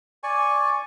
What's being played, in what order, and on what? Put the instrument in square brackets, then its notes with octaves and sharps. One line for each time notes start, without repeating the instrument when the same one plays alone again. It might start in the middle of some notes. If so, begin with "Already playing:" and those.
[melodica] D5 G#5 C#6